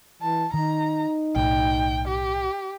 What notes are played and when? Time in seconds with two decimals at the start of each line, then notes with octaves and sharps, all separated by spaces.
0.22 E3 A5
0.54 D#3 D#4 A#5
1.36 B1 A2 G5
2.08 G4